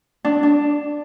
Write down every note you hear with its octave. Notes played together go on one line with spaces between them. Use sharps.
D4
D4